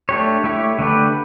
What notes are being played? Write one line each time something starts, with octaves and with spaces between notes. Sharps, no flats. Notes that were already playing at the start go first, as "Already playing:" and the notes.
A3 D4 G4 C#5
A3 E4 G4 C#5
D3 A3 D4 G4 B4